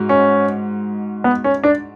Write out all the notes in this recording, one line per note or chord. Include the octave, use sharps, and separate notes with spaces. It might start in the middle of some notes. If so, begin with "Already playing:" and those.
Already playing: G#2 G#3 F#4
C#4
B3
C#4
D4